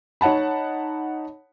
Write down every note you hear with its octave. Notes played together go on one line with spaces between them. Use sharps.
D#4 C#5 F#5 A5 B5